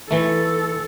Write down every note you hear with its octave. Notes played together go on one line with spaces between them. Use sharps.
E3 A3 A4